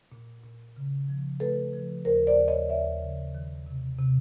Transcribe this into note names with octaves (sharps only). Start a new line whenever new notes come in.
A#2
A#2
C#3
F3
A3 A4 B4
F3
D#2 A#4 C5
C5 D5
D#2
C#5 D#5
D#2 D5 E5
C#3
D#3
C3
C3